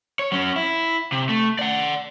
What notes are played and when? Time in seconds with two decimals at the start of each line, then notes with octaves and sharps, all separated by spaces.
0.19 C#5
0.32 F#3 C#4
0.56 E4
1.12 C3
1.29 A3
1.59 D5 F#5